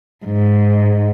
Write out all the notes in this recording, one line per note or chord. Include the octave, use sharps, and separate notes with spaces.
G#2